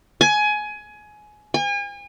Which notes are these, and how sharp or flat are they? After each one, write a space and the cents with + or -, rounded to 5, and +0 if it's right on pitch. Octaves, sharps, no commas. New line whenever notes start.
G#5 +20
G#5 -40